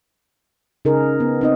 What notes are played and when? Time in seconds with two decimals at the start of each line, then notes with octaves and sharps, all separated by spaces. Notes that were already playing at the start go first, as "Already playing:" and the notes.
0.85 C#3 D#4 G#4 A#4
1.20 B3
1.41 C4 D#4 D#5